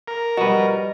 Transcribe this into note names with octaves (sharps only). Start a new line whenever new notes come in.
A#4
F3 G3 F#4 B4 D#5